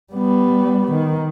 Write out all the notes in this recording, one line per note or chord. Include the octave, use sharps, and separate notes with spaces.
G3 B3
D#3